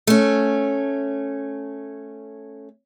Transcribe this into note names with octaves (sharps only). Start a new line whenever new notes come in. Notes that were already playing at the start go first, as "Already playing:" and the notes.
A3 C#4